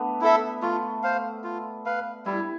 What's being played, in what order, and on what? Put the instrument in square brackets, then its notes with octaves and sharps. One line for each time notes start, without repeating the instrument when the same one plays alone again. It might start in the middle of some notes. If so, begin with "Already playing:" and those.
Already playing: [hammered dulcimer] A3 B3 D4
[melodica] E4 A4 E5
[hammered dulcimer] A3 [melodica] F4
[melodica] C5 F5
F4
B4 F5
[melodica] G3 [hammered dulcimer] E4